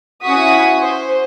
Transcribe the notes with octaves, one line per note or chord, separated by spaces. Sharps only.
C#4 E4 F#4 C#6 D#6 B6
C5